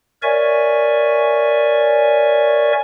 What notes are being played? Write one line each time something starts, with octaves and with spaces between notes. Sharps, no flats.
A#4 C#5 D5 E5 G#5 C#6